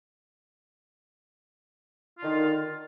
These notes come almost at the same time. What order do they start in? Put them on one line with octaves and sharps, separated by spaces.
F4 D3 D#3